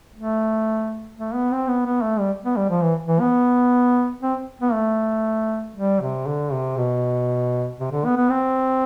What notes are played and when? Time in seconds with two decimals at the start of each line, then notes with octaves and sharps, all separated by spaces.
0.16 A3
1.17 A3
1.34 B3
1.51 C4
1.68 B3
1.85 B3
2.01 A3
2.19 G3
2.44 B3
2.56 G3
2.69 F3
2.83 E3
3.07 E3
3.20 B3
4.22 C4
4.61 B3
4.73 A3
5.76 G3
6.01 C3
6.26 D3
6.52 C3
6.77 B2
7.79 C3
7.92 D3
8.05 B3
8.16 B3
8.29 C4